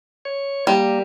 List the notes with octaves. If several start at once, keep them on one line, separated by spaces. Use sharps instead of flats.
C#5
G3 A#3